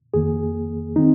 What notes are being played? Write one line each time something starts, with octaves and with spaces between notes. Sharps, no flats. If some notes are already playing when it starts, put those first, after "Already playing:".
F2 D#3 A#3 G#4
D#3 C4 D#4